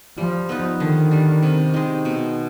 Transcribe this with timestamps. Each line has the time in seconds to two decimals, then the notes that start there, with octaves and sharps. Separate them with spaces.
0.18 F3 G3
0.49 B3 D#4 B4
0.80 D3 D#3
1.11 G3 D4
1.43 C3
1.74 D#3 G#3
2.05 B2